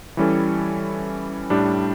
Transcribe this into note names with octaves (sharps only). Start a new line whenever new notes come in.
E3 G3 C#4 E4 A4
A2 G3 D4 G4